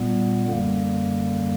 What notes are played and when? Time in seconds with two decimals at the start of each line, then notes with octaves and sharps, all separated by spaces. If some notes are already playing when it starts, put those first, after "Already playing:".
Already playing: A#2 G3 B3
0.47 F#2 D3 G3 A#3